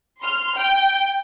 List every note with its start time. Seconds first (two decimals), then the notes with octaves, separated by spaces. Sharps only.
0.21 C6 F6
0.57 G5